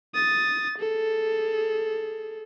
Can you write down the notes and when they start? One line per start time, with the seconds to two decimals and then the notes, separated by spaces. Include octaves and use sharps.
0.15 D#6 A6
0.79 G#4 A4